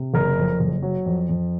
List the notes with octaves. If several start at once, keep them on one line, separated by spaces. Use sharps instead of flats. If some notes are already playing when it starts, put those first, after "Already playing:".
Already playing: C3
F#1 A#4
F2
F#1
F#3
F2
F2